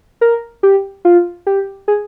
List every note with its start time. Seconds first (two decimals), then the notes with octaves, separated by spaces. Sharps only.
0.21 A#4
0.63 G4
1.05 F4
1.47 G4
1.88 G#4